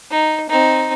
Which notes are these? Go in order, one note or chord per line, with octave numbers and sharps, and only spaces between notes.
D#4
C4 D#4